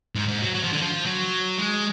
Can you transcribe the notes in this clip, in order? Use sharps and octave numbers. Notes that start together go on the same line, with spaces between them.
G#2
G#2
F#3
F#3
F3
D3
F3
F#3
G#3